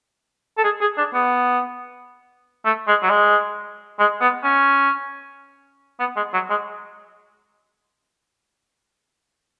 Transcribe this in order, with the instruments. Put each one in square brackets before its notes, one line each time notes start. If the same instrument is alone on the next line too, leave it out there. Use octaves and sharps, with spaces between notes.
[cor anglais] A4
G#4
G#4
D4
B3
A3
G#3
F#3
G#3
G#3
B3
C#4
B3
G#3
F#3
G#3